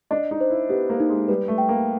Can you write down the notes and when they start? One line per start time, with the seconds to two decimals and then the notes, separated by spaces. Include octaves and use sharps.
0.11 D4 D#5
0.31 D#4
0.41 C5
0.50 E4
0.69 B3 G4
0.90 A#3
1.00 D#4
1.09 G#3
1.28 G3 B4
1.48 A3
1.58 G5
1.69 A#3